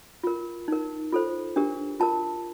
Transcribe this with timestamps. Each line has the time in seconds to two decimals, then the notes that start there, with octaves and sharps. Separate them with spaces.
0.24 F4 A#4
0.68 D#4 A#4
1.12 F4 A4 C5
1.56 D4 G4 A#4
2.00 F4 A#4 A5